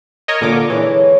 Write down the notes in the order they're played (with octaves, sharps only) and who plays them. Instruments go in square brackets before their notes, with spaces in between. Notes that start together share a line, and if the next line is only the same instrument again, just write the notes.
[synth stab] A#4 C#5 D#5
[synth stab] A#2 D3 D6 [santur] A4 E6
[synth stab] E3 [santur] G#3 C#5